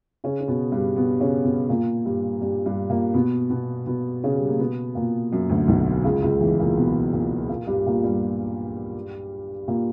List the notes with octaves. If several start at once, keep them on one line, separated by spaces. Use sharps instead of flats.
C#3 C#4
C#4
B2 B3
G2 G3
B2 B3
C#3 C#4
B2 B3
A#2 A#3
G2 G3
G2 G3
G2 G3
A#2 A#3
B2 B3
B2 B3
B2 B3
C#3 C#4
G3
A#3
B2 B3
A#2 A#3
F#2 F#3
D2 D3
B1 B2
C#2 C#3
C#2 C#3
E2 E3
A#2 A#3
B2 B3
A#2 A#3
A#2 A#3
G2 G3
A#2 A#3
G2 G3
A#2 A#3